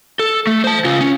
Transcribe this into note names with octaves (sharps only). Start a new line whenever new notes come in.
A4
A3
C5 A5
C#3 F4
C#4